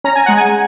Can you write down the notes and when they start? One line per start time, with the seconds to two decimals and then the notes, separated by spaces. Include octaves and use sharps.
0.04 C#4 A#5
0.16 G#5
0.26 G#3 F#5
0.37 G#5